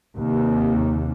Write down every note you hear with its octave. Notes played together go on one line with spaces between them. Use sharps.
D#2 C3